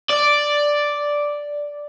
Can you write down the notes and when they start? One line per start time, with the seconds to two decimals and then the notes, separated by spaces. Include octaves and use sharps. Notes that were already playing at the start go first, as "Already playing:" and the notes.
0.10 D5